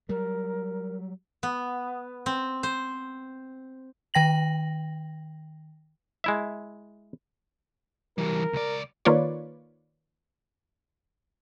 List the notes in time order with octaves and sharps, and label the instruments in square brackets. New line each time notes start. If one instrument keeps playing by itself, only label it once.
[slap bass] F#3 G3 [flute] A#4
[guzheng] B3
C4
C5
[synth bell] D#3 G5 A#6 F#7
[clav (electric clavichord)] G#3 E4 E5
[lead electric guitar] E3 G3 [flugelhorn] A#4
[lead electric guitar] C#2 D5
[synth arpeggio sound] D#3 A#3 F4 B4 C#5 D5